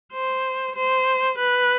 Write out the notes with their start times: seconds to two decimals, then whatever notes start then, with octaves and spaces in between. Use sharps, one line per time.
0.13 C5
0.76 C5
1.38 B4